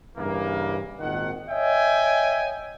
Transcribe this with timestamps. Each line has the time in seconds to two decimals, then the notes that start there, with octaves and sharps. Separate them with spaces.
0.17 G2 C#3 E3 A#3
1.00 G#1 A#2 D#3 F#5
1.50 C#5 D#5 E5 G5 G#5